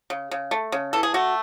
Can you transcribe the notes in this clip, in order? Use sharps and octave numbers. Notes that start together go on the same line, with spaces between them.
C#3
C#3
A3
C#3
E3 A4
G#4
A3 F#4